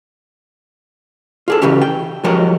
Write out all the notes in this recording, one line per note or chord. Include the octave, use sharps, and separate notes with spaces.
F4 G#4 A4
C#3 E3 F#3 C#4 G4
G5
F3 F#3 G#3 G4 A#4 C#5